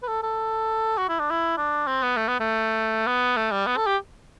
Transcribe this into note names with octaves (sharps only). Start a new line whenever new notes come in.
B4
A4
A4
F#4
E4
D4
E4
D4
C4
B3
A3
B3
A3
B3
A3
G3
B3
A4
G4